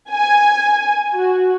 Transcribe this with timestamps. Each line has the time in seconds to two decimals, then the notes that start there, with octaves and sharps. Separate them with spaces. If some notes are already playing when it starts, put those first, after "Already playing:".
0.10 G#5
1.14 F#4